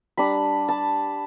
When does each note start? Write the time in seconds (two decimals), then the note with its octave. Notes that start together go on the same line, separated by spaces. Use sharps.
0.17 G3 D4 B5
0.68 A5